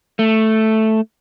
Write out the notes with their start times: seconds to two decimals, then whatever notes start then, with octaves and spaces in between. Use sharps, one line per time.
0.19 A3